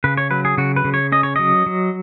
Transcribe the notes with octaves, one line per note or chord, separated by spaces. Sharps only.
C#3 B4
C#5
F#3 B4
G#4
C#3 F#4
B4
C#3
C#5
C#4 D#5
C#5
F#3 D#5
F#3